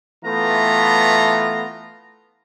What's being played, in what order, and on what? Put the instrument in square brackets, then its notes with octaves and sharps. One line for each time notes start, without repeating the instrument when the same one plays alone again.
[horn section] E3 A3 B3 F4 A#5